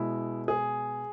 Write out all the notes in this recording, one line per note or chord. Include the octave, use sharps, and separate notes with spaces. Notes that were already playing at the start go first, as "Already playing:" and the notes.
Already playing: B2 G#3 E4
G#4